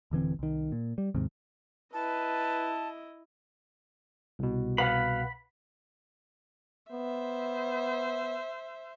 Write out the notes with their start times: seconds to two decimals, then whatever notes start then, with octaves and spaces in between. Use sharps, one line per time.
0.11 D#1 D3 E3 C4
0.39 C2 D#3
0.72 A#2
0.98 G3
1.14 D#2 G#2 C3
1.94 E4 B4 D#5 A5
4.39 C2 B2
4.78 B4 F5 F#5 B5
6.92 B3 C5 E5